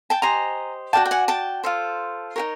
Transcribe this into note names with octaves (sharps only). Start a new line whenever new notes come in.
G5 A5
G4 C5 D#5 G#5 A#5
F#4 B4 D5 G5 A5
G5
F#5 G#5
G5 A5
F4 A4 C5
D#4 G4 A#4 C#5